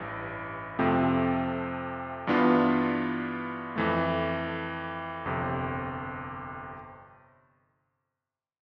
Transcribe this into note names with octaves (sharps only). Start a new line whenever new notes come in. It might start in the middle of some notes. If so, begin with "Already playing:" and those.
Already playing: A1 G2 E3
F2 C3 F3 A3 C4
G2 E3 B3 D4 F4
F2 E3 A3
G1 F2 C3